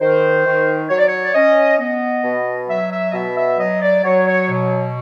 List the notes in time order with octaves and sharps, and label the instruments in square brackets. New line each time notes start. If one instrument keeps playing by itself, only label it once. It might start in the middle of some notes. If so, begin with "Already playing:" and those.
[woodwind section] D#3 C5
D#3
F#3 C#5
D5
C#5
D5
C#4 D#5
B3 D#5
B2
F#3 E5
E5
D#5
B2 E5
E5
F#3 D#5
D5
F#3 C#5
C#5
B2